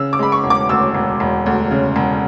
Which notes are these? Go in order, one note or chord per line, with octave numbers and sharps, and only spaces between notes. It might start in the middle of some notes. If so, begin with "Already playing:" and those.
Already playing: C#3 E6
D6
G#3 B5
C#6
E1
D6
D2 E6
E1
E1
D2
C#3
E1